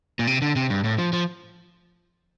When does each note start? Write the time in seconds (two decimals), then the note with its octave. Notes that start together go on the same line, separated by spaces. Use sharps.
0.19 A#2
0.27 C3
0.42 D3
0.56 C3
0.70 G2
0.84 A2
0.98 F3
1.13 F3